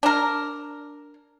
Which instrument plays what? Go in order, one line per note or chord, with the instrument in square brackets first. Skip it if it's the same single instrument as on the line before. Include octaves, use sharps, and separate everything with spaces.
[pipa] D4 A#4